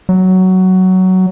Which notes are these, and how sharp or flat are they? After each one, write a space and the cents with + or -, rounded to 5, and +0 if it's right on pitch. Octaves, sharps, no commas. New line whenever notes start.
F#3 +10